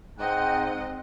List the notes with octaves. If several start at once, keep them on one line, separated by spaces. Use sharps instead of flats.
G#2 C4 D#4 D#5 F#5 G5 F#6 G6